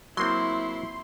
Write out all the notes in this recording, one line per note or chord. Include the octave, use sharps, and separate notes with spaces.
F#3 A#3 C4 E4 C6